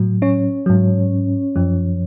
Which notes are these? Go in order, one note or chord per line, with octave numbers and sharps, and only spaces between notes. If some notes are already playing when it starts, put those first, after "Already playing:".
Already playing: A2 F#3
C#4 C#5
G#2 F#3
F#2 F3